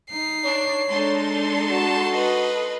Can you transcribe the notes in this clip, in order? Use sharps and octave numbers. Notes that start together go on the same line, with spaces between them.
D#4 C7
D4 C#5
G#3 D4 D#4 A4 C6
F#4 A5
B4 D#5